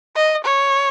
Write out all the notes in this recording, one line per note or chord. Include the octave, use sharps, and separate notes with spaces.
D#5
C#5